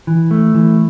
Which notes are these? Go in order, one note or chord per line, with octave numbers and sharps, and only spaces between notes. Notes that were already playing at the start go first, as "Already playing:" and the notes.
E3
A3
E3